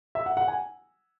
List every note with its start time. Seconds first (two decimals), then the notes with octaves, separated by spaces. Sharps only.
0.15 E5
0.26 F#5
0.37 F#5
0.48 G#5